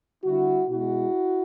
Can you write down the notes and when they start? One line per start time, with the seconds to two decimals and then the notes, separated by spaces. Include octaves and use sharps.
0.23 D3 G3 E4 F#4
0.69 B2 G#3 E4 F#4